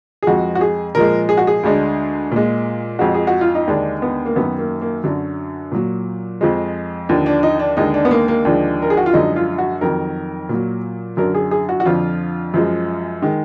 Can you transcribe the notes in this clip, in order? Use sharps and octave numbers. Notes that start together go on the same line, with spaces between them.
G#4
F2 F3 G#3 F#4
F#4
G#4
A#2 F3 G#3 A#4
G#4
F#4
G#4
D2 D3 G#3
A#2 G#3
F2 F3 G#3 F#4
G#4
F#4
F4
D#4
D#2 D3 G#3 D4
B3
A#3
F#2 D#3 F#3 B3
A#3
A#3
F#2 D3 F#3
A#2 F#3
F2 F3 G#3
D#2 D3 F3
D4
D#4
D4
D#2 D3 G#3 D#4
D4
B3
A#3
A#3
D#2 D3 F3 G#3 D4
A#4
G#4
F#4
F4
F#2 D3 F3 G#3 D#4
F4
F#4
F2 D#3 F#3 A#4
A#2 F#3
F#2 D3 F#3 A#4
G#4
G#4
F#4
F#4
F2 D3 F3 F4
F#2 F3 G#3
D#3 G#3